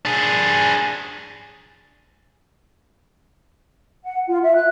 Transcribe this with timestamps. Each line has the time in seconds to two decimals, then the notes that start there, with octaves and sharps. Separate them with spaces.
0.05 D4 G#4
4.04 F#5
4.28 F4
4.44 E5
4.55 F#6